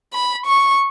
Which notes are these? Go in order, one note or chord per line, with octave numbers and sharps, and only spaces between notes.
B5
C#6